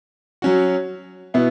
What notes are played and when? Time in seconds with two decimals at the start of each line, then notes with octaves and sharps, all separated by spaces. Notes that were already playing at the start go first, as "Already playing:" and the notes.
0.42 F#3 C#4 F#4
1.34 B2 B3 E4